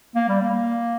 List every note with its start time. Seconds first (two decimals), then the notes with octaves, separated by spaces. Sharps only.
0.15 A#3
0.29 G3
0.42 A#3